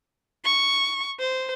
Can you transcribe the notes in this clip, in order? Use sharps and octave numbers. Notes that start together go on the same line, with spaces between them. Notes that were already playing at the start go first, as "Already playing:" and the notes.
C#6
C5